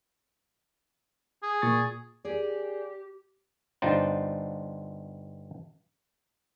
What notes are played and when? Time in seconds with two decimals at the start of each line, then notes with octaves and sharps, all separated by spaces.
1.43 G#4
1.62 A#2 C#6 A6
2.25 G4 G#4 A#4 D5
3.82 G1 D4 D#4 F4 C5 G5